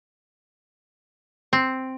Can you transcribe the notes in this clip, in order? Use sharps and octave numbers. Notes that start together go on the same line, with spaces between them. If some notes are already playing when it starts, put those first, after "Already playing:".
C4